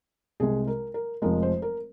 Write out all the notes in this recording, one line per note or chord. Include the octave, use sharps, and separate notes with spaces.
C2 C3 G#3 G#4
A#4
A#4
F1 F2 F3 G#3 A#4
C5
A#4